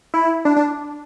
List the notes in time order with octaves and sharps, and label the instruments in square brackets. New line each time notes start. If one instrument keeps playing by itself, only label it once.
[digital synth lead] E4
D4
D4